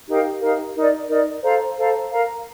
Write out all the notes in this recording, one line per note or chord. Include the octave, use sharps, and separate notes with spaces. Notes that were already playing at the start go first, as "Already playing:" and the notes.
D#4 G4 A#4 F5
D#4 G4 A#4 F5
D#4 A#4 D5
D#4 A#4 D5
A4 C5 F5 A#5
A4 C5 F5 A#5
A#4 F5 A#5